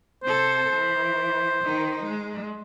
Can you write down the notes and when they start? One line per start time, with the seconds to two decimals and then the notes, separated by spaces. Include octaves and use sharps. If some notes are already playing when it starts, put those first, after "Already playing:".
0.24 C3 A4 C5
0.73 E3
1.64 D#3 D#4
2.04 G#3